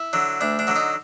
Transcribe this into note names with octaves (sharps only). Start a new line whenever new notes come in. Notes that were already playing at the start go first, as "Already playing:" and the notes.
Already playing: E4
D3 F#3
D2 D4
D4
D3 F#3
D#4